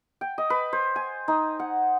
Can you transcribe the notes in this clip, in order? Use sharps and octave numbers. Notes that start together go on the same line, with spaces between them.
G5
D#5
B4
C5
G#5
D#4
F#5